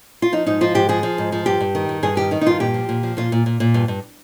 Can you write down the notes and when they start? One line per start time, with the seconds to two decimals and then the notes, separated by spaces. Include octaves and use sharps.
0.22 F4
0.32 F3 D#4
0.46 G#2 D#4
0.61 F3 F4
0.75 G#2 G4
0.89 F3 G#4
1.03 F3
1.18 G#2
1.32 F3
1.46 G2 G4
1.60 G2
1.75 D#3
1.89 G2
2.03 G2 G#4
2.17 D#3 G4
2.31 D#3 D#4
2.41 D#4
2.46 G2 F4
2.60 A#2 G4
2.74 F3
2.89 A#2
3.03 F3
3.17 A#2 F4
3.32 A#2
3.46 A#2
3.60 A#2
3.74 G2
3.88 G2